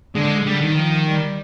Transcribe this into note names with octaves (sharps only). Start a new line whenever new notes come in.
D3 G#3
D3 G3
D#3
F3
G3